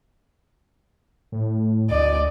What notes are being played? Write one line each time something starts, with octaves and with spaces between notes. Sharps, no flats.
A2
D2 D5 D#5